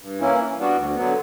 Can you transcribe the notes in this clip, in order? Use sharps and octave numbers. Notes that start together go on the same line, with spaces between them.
G2
E3 A#3 C#4 E4
E3
G3 B3 D4 F#4
D2
D3 F#3 B3